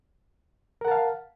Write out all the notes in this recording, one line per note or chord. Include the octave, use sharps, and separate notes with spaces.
A#4 F5 F#5 A5